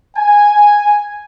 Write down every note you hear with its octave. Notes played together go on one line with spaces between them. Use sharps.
G#5